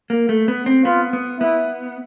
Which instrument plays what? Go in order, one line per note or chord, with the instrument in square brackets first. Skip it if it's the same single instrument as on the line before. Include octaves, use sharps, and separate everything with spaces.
[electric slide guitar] A#3
A3
B3
C4
[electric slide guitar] B3 [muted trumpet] F4
[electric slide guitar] B3
[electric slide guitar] B3 [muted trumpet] E4